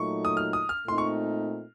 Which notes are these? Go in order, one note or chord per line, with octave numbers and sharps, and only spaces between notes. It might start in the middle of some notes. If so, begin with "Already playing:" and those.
Already playing: A#2 F#3 A3 D#4 C#6
D#6
F6
D#6
F6
A#2 A3 C4 D#4 C6
C#6